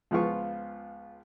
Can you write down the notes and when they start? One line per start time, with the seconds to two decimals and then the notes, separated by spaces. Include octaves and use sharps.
0.11 C#2 F3 B3 F4 C#6